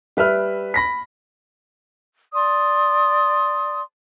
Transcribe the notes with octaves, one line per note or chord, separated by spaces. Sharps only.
G3 B4 E5 F6
B5 A#6 B6
D5 C6 D#6